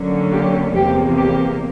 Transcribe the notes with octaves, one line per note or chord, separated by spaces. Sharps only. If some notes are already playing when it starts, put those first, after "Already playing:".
Already playing: D3 F#3 A#3 C#4
G4
E2 C3 F3 A#3 G4
G4